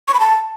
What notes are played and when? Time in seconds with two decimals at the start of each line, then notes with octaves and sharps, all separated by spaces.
0.08 C#6
0.14 B5
0.20 A5